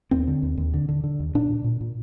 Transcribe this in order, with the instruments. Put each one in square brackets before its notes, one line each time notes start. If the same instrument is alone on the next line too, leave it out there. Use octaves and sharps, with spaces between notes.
[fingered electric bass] D#2 C4
D3
D#2
D#2
D3
D3
D3
D#2
A#2 D4
A#2
A#2
A#2